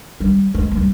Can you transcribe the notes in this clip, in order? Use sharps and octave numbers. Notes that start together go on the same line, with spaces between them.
G3
G#3
G#3
G3